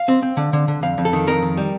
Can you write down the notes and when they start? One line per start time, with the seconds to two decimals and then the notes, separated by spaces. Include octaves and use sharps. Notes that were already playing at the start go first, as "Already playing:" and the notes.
Already playing: F5
0.08 C4
0.22 C4
0.37 D3
0.53 D3
0.68 D3
0.83 F2 F5
0.98 F2
1.05 A4
1.13 D#3
1.27 F2 A#4
1.42 D#3
1.57 G3